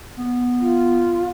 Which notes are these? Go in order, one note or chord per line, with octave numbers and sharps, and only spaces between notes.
B3
F4